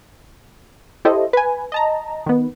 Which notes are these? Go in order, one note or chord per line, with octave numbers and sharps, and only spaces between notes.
E4 G4 A4 C5 D#5
B4 G#5
D#5 A5 A#5
D#3 B3